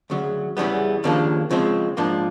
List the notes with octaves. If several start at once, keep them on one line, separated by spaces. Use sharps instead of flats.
D2 C#3 F#3
E2 C#3 E3 G3 B3
D#2 C#3 F3 A#3 D4
C#3 F3 G#3 C4
G#2 F3 A#3 D4